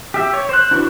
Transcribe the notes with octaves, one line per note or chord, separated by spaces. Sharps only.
G4 E5
C#5
C5 F#6
D4 E4 F#4 B4 C#6